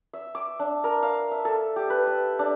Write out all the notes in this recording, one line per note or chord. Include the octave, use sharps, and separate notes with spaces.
E5
D6
D4
A#4
F5
E5
A4
G4
B4
E5
D4